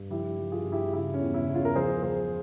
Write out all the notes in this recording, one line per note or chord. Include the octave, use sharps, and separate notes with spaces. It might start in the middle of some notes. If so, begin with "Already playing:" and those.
Already playing: G2
F3 E4 G4
F3
F4 G#4
G2
E4 G4
C#3 E4
C#4
E2
E4
E2
C#4 F4
A#4
F3 G#4 C5
F3 G#4 C5